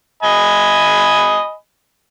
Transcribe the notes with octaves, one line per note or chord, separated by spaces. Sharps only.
D#5 G#5 B5